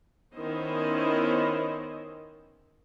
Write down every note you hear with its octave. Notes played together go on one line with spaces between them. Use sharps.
D#3 B3 C#4 E4 C5 D#5